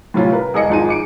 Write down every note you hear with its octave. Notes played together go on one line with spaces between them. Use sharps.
A2 C3 G3 C#4 F4
A#4 B4
E1 G#4 D#5 C#7
G#1 F3 D#4 G#4 D#7
D6 C#7 D7